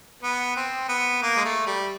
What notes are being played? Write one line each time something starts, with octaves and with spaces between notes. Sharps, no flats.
B3
C4
B3
A#3
G#3
A3
G3